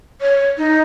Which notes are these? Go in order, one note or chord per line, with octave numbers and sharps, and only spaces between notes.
C#5
D#4